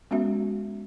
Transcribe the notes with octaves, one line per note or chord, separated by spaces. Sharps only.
G#3 B3 C#4 F#4 E5